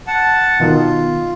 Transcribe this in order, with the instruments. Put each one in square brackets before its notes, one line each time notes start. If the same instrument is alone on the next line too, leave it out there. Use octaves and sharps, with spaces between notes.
[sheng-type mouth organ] F#5 A5
[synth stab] B2 D#3 [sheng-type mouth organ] F4